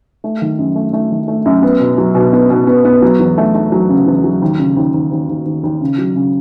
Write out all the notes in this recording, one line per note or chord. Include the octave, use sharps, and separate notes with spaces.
A3
D#3
F#2
A3
A3
D#3
A3
F#2
B3
B2
F#3
B2
B3
B2
B3
B3
F#3
E2
A3
A3
F#3
C#3
E2
F#3
D#2
C#3
D#2
D#2
D#2
D#2
D#2
D#2
C#3
F#3
C#3